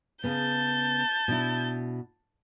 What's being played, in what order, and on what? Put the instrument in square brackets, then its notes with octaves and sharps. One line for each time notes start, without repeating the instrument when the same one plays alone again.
[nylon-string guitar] C#3 B3 [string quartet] A5 G6
[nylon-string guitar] B2 D4 E4